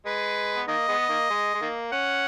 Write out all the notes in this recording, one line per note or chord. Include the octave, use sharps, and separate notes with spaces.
G#3 B4
B3
D#3 A#3 D#5
G#3 B3
D#3 A#3
G#3
G#3
D#3 A#3
C#4 F#5